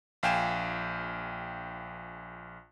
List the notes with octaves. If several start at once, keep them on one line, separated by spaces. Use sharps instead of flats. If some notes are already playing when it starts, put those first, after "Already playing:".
A#1 F5 G5 G#5 E7